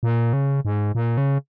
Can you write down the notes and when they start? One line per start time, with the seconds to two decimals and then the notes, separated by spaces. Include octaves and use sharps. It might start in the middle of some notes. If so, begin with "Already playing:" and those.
0.03 A#2
0.33 C#3
0.65 G#2
0.95 A#2
1.18 C#3